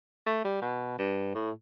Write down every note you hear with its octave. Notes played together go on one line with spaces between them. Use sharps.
A3
G3
B2
G2
A2